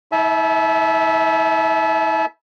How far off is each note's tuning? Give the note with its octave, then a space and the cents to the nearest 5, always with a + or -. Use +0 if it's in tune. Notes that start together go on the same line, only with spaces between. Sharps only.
E4 -45 E5 +0 A5 -45